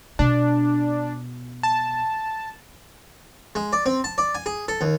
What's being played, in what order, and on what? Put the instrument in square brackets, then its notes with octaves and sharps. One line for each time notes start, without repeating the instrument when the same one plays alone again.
[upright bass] B2 [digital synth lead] D4
[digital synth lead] A5
[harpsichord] G#3
D5
C4
A5
D5
G#5
G#4
A4
D#2